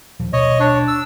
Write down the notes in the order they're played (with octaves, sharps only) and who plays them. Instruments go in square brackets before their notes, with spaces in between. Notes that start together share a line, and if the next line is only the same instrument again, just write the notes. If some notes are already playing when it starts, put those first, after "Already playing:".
[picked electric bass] D#2 A#2 F3
[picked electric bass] D#1 B1 B2 [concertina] C#5 D#5
[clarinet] D4 [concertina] C#5
[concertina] E6